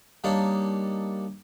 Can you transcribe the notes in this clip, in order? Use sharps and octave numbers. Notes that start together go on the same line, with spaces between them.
G3 A#3 D4 D#4 C#5 A5